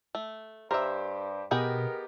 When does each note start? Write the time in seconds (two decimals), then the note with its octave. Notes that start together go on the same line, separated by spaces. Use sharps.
0.15 A3
0.71 G2 G4 A#4 C5 E5
1.51 B2 B3 G4 G#4 A#4 D#5 G5